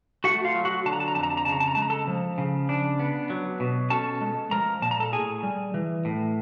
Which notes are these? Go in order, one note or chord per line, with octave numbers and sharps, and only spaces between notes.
A3 F#4 F#5
F4 F5
F#3
F#4 F#5
D3 A5
A#5
A5
A#5
F2 A5
A#5
A5
A#5
C#3 A5
A#5
A5
A#5
G#3 A5
A#5
A4 A5
F3
C#3
D4
B3
F#3
B2
C#4 A4 A5
G#3
F3 A#4 A#5
A#2 A5
A#5
A4 A5
A2 G#4 G#5
G3
E3
A2